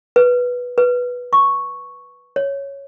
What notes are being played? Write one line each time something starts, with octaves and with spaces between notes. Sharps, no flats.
B4
B4
C#6
C#5